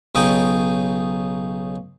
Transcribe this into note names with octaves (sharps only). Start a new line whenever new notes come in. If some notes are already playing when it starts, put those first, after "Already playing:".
B1 C#3 D#4 D#5 G5